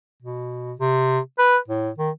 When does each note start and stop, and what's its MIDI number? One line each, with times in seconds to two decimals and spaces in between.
0.22 0.74 47
0.79 1.20 48
1.38 1.57 71
1.68 1.90 45
1.98 2.10 51